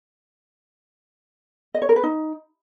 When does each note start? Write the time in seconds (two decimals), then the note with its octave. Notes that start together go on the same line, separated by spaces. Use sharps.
1.74 D#5
1.82 C#5
1.89 A#4
1.96 B4
2.03 D#4